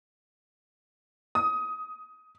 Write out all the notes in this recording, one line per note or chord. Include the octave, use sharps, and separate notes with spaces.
D#6